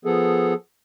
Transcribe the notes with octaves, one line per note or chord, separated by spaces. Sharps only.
F3 B3 G#4 A4